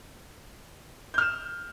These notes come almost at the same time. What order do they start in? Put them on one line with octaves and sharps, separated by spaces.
G6 F6 E7